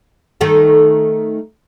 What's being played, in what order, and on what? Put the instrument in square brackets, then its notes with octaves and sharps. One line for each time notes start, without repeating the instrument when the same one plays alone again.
[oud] D#3 A3 A4